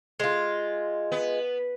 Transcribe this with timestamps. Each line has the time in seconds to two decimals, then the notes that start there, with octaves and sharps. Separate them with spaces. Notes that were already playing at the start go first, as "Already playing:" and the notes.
0.20 G#3 F4
1.12 B3